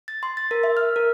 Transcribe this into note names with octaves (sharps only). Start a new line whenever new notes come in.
A6
C6
A6
A#4
E5
F6
A#4